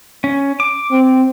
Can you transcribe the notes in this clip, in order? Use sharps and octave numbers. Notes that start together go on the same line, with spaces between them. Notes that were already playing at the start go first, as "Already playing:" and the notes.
C#4
D6
C4